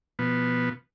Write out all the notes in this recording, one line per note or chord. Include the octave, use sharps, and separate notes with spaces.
B2 F3 B3